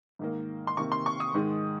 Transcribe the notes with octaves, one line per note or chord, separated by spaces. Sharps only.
G#2 D#3 A#3
C6
C3 D#3 A#3 C#6
C6
C#6
D#6
G#2 D#3 G#3